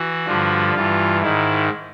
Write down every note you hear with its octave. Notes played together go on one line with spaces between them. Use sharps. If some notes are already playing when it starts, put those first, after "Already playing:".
Already playing: E3 F#4
G2 D3 F3
G2 E3 F4
G#2 D#3 E4